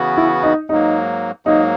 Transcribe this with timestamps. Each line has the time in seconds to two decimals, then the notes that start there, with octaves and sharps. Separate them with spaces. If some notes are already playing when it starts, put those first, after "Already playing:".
Already playing: C#3 E3 B3 F#4
0.17 E4
0.43 D#4
0.69 G#2 F#3 A#3 D#4
1.46 G#2 F#3 A#3 D#4